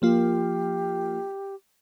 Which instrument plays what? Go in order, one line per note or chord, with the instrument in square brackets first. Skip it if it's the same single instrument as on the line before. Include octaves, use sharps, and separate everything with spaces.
[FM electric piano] F3 A#3 F4 [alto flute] G4